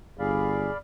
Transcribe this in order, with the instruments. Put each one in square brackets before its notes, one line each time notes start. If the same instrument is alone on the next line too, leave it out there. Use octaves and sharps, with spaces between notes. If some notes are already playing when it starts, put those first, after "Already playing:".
[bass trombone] G1 [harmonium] G#4 [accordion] D5 F5 B5